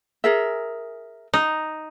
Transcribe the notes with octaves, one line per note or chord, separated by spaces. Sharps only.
G#4 A#4 E5
D#4